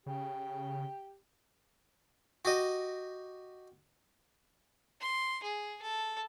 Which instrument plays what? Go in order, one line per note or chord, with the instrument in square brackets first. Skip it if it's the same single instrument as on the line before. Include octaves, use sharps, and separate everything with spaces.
[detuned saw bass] C#3 [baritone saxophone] G4
[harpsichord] F#4 G4 D#5
[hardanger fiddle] C6
G#4
A4